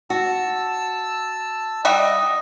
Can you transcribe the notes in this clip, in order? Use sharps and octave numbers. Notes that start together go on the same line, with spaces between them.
F#4 A5 E6
G3 F#4 D#5 E5